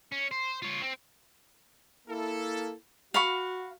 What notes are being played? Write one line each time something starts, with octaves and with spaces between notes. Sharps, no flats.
C#4
C5
F4 C#5
C4
A#3 E4 A4
F#4 F5 B5 C#6